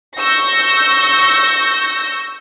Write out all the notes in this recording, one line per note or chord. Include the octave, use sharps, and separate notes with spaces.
C#6 E6 G6 A#6